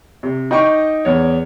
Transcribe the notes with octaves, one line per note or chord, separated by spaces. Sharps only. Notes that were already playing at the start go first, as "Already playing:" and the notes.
C3
D#4 D#5 G5 C#6 D6
E2 C#5